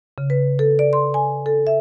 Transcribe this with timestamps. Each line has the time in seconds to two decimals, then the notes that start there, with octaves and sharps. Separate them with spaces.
0.18 C#3
0.30 B4
0.59 A4
0.79 D5
0.93 C6
1.14 G#5
1.46 A4
1.67 E5